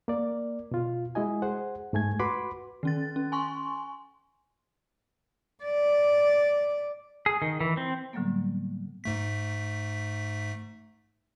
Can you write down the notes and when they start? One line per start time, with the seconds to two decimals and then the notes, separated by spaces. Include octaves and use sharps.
0.08 A#3 D5
0.71 B2 F4
1.15 G#3 E4 F#4 D#5 G#5
1.42 G#4 C5 F#5
1.93 G#2 A3 G#5 G#6
2.19 F#4 B4 B5 C6 D6
2.83 D#3 C#4 A6
3.16 C#4
3.32 G#5 C6 C#6
5.64 D5
7.26 G#4
7.42 D#3
7.60 E3
7.77 C4
8.13 A2 D3 F#3 G3 A#3 B3
9.04 G#2 A3 B6